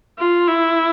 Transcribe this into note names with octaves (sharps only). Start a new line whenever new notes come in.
F4
E4